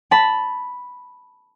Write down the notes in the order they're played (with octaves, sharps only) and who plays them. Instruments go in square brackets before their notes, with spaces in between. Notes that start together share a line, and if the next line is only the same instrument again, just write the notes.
[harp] A5 B5